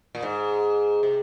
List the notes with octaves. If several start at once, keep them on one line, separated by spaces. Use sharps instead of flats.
A#2
G#2
C3